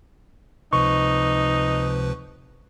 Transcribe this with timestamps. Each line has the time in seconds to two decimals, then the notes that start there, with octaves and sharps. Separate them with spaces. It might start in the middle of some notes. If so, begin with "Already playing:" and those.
0.73 C#2 C3 F3 D#4 B4 C#6